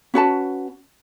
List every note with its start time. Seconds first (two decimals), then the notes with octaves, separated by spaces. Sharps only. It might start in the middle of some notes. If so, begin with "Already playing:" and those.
0.14 C#4 F#4 B4 A5